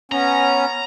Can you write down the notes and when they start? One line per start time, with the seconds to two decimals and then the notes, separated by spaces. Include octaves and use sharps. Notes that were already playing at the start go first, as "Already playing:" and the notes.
0.12 B3 C#4 A#5